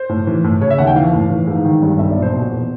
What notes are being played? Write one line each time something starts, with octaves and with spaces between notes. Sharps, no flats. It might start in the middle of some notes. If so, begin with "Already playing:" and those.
Already playing: C5
A2
E3
A2
C#3 C#5
E5
D#2 F#5
G5
E3 F5
A2
E3
G#2
D#3
G2
B1 E5
D5
A#2
C5
B2
E2